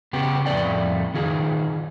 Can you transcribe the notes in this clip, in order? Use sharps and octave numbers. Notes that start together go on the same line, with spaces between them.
C#3 B3 G4
F2 A2 A3 D5 G5
D#3 F4 G#4